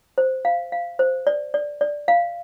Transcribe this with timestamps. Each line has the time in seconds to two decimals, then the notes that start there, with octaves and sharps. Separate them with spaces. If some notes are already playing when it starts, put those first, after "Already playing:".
0.18 C5
0.45 F5
0.72 F5
0.99 C5
1.27 D5
1.54 D5
1.81 D5
2.08 F5